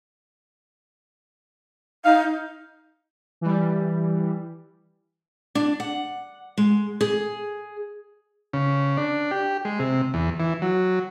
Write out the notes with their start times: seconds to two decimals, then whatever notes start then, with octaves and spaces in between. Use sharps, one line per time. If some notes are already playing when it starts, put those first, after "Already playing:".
2.05 D#4 F5
3.41 E3 G3
5.55 D4
5.80 F#5
6.58 G#3
7.01 G#4
8.53 C#3
8.97 D4
9.31 G4
9.65 G#3
9.79 C3
10.14 E2
10.40 E3
10.62 F#3